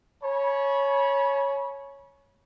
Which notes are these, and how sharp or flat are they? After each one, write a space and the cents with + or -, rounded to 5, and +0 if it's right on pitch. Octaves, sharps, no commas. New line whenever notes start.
C#5 +0 G#5 +35 B5 -30